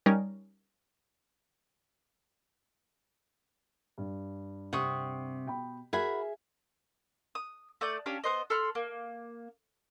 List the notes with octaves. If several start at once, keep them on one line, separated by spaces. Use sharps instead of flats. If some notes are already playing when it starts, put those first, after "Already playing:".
G3 C#4 D#4 A#4
G2
C3 F#5 C#6 D#6
B2 G5 B5
F#4 G#4 A#4 E5 F#5 G#5 B5
D#6
A3 D5 D#6 G6
C#4 D4 G4 F5
B3 C5 D#5
A4 B5 C6 F6
A#3